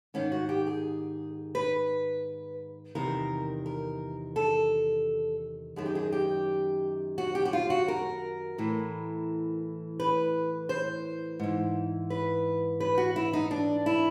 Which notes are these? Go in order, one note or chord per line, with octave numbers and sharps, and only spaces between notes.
G#2 D#3 C#4
F#4
G4
G#4
B4
E2 C3 D#3 A#4
A#4
A4
F#2 D#3 G#4
G4
G#4
G4
F#4
G4
F#4
F4
F#4
A#4
A2 E3
B4
C5
G#2 E3
B4
B4
F#4
E4
D#4
D4
E4